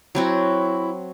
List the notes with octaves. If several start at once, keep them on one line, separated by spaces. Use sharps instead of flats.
F#3 C4 E4 F#4